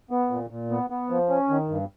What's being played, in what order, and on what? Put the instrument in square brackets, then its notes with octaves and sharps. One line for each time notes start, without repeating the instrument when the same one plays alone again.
[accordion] B3
A#2
A#2
B3
B3
F3
C#4
D#3
G2